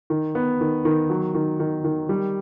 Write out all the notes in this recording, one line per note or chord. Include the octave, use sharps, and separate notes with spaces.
D#3
B3
D#3
D#3
F#3
D#3
D#3
D#3
G3